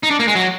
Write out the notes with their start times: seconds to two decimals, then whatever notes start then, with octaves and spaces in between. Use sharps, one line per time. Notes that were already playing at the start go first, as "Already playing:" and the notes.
0.03 D#4
0.11 D4
0.19 A#3
0.28 G#3
0.35 F#3